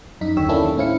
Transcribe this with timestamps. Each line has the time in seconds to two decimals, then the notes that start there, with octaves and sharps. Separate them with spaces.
0.21 F#2 D#4 B6
0.36 D#2 D3 G4 C#5 E6
0.49 A#3 C#4 D4 E4 A4
0.63 D#3
0.77 A2 C4 C#4 E4 F5 C#7